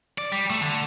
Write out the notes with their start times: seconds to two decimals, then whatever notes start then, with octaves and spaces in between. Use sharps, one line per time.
0.18 D5
0.32 G3
0.50 A3
0.62 D3